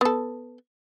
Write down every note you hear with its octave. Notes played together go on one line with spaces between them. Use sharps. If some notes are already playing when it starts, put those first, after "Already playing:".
B3 A4